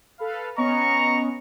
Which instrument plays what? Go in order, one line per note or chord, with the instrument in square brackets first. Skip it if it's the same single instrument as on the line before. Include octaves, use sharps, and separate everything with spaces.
[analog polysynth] A4 B4 F5
[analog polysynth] B3 C#4 D#5 [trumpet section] A#5 C#6